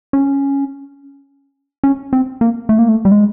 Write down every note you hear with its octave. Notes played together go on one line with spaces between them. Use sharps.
C#4
C#4
C4
A#3
A3
A#3
A3
G3
G#3